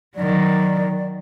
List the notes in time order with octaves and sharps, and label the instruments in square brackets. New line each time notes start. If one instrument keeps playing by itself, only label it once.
[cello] D#3 F#3 [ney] D5